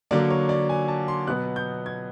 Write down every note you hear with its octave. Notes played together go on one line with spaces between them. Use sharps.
D3 F#3 A#3 D5
C#5
D5
G#5
A5
C6
B2 F#3 B3 F#6
G6
G#6